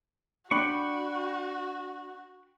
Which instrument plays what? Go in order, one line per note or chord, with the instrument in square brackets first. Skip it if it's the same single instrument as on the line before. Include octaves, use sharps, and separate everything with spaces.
[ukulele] D4 [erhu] F#4 [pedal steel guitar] G5 B5 C#6